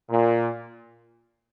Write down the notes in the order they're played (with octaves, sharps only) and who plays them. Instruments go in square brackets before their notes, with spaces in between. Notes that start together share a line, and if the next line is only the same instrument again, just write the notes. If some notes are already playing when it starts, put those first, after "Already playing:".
[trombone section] A#2